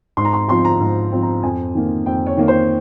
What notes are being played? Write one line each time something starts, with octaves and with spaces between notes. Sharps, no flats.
G#2 C6
A#5
C6
F3 C4 C6
A#5
G#2
F3 C4
A#5
F2 G#5
D#3 A#3
F2 G5
C#5
D#3 A#3
C5